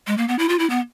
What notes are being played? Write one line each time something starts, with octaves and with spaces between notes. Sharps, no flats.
G#3
A#3
B3
E4
F4
E4
B3